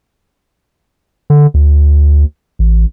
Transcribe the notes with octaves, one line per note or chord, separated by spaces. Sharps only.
D3
D2
A1